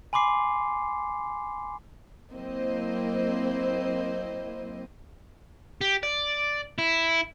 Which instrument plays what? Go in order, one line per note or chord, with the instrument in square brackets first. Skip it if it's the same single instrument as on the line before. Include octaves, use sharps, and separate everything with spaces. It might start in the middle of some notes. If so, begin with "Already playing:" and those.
[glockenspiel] G#5 B5 C6 D6 C7
[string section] F#3 A#3 C4 E4 C5 D#5
[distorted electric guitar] G4
D5
E4